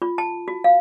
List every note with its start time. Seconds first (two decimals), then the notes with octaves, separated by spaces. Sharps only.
0.02 F4
0.18 A5
0.48 F#4
0.64 F5